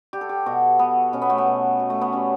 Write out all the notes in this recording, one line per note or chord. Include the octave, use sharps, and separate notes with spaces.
G3 G4
A4
G4
B2 F#4
B2 B3
B2 C#4
B3
A3
B3
B2
B2
A3
B3
G3 C#4